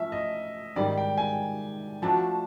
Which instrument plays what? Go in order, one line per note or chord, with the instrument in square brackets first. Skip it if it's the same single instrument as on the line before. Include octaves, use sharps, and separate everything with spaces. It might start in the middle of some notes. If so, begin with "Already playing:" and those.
Already playing: [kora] F3 A3 C#4 F4 [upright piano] E5
[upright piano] D#5
[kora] G#2 D#3 G3 [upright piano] D5
[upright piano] G5
G#5
[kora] F3 A3 D4 F#4 [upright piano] A5